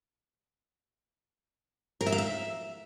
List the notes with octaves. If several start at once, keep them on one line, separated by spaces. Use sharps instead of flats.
A#4
E5
F5
E5